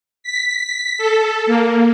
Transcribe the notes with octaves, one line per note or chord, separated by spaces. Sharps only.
B6
A4
A#3